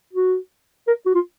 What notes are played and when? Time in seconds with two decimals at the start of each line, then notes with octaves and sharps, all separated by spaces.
0.13 F#4
0.87 A#4
1.06 F#4
1.15 F4